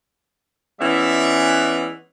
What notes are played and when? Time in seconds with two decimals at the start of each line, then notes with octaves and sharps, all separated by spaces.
0.79 E3 G#3 B3 C#4 D5 E5